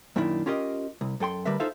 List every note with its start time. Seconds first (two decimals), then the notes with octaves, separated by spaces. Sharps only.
0.16 F#2 A#2 D#3 D4 E4
0.46 C#4 F4 G4 A#4 D#5
1.01 C2
1.20 F#2 A4 G5 C6
1.45 D2 D3 G3 A#4 B4 E5
1.60 D#4 F4 A4 C5 E5 F5